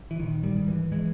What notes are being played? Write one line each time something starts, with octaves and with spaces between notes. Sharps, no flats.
E3
A#1 D#3
D#3 G3
G#2
E3
E3 G#3